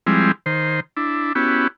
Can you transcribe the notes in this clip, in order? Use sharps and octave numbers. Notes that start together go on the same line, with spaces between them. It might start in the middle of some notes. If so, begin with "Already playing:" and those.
F3 G3 G#3 C4 E4
D#3 C5
D4 E4
B3 C#4 E4 F#4 G4